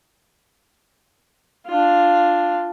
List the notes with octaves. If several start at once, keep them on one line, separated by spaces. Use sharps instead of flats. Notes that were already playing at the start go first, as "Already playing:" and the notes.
D4 F4